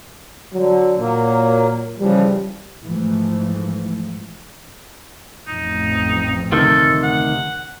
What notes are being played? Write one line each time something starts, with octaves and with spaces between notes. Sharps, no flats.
D3 F#3
A#2 F#3 A#3
C#3 E3 F3 G3
G#2 E3 F3 G#3 A3
A1 F2 D#4
D2 C3 D#3 A4
F#5